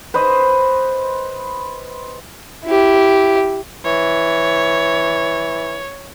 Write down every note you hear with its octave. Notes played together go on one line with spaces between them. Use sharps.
B4 C5 D#5
E4 G4
E3 C#5